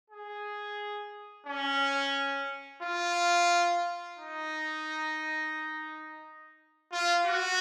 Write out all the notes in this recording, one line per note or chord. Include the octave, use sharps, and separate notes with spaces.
G#4
C#4
F4
D#4
F4
F#4